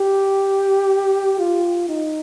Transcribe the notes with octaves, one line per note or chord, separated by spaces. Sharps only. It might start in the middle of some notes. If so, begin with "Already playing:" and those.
Already playing: G4
F4
D#4